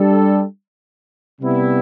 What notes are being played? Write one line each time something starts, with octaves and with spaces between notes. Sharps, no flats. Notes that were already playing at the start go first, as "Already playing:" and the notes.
Already playing: G3 D4 A4
C3 G3 B3 E4